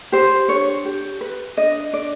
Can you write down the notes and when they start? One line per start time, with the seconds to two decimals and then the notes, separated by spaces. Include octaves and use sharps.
0.12 G4 C5
0.48 D4 C#5
0.85 G4
1.21 B4
1.57 D4 D#5
1.93 D4 D5